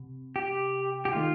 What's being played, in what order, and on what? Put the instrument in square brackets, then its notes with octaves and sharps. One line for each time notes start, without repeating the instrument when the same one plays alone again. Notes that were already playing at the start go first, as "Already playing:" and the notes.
Already playing: [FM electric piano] C3
[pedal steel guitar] G4
G4
[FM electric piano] D#3 A3 D#4 [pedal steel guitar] F4